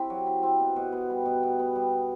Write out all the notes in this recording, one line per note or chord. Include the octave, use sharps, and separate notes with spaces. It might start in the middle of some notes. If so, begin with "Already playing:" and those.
Already playing: C4 E4 G4
F#3
E4
C4
B2
B2
B3
G3
B2
B2
B3
G3